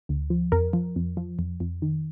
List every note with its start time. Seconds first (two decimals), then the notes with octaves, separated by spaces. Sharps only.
0.09 D2
0.30 F3
0.52 F2 A#4
0.73 F3
0.96 F2
1.17 F3
1.39 F2
1.60 F2
1.82 D#3